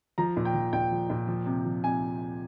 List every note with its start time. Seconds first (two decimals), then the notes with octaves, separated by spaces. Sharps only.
0.18 F3 A#5
0.37 A#2
0.45 G5
0.54 F3
0.73 A#2 G5
0.91 F3
1.10 A#2
1.28 F3
1.46 C3
1.65 F3
1.84 C3 G#5